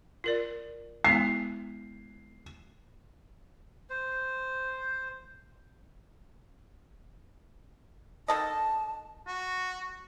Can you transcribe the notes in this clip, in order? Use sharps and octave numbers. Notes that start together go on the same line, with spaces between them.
F4 A#4 D5
G#3 B3 E4 C7
C5
D#3 A4 D#5 A5
F#4